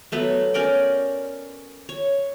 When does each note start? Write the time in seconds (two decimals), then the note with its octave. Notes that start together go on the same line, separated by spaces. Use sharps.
0.12 F#3 A3 B3
0.54 C#4 A#4 D5 G5
1.89 C#5